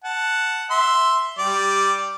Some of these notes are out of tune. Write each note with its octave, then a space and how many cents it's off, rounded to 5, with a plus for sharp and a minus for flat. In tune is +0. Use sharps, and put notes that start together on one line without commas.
F#5 +0 A5 +0
E5 +0 C6 +0
G3 +0 G4 +10 D5 +0